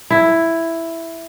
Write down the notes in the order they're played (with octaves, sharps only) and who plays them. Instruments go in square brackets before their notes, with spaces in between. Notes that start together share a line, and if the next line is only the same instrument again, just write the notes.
[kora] E4